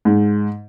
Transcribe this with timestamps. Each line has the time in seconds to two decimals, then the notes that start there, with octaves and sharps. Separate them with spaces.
0.05 G#2